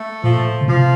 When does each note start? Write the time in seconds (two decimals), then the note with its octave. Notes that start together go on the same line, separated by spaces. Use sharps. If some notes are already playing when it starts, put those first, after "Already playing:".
Already playing: A3
0.23 A#2 F3
0.61 C#3
0.68 C3 F3